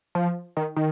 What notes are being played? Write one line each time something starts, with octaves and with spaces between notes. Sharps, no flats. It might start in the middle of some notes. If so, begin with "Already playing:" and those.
F3
D#3
D#3